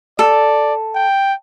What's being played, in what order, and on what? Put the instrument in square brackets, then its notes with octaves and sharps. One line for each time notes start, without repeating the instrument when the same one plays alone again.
[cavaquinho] A4 [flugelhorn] D5
[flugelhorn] G5